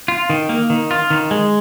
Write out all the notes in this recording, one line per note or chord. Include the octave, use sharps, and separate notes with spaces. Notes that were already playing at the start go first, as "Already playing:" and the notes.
F4
D#3
A#3
D#3
F4
D#3
G#3